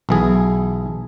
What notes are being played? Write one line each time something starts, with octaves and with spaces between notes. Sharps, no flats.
B1 E3 G#4